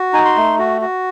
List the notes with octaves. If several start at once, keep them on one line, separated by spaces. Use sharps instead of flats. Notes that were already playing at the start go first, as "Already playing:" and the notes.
Already playing: F#4
D#4 G#5
C6
A3
F#4
F#4